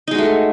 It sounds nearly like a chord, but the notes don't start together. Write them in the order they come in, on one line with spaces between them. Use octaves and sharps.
D#4 G#3 F#4 A3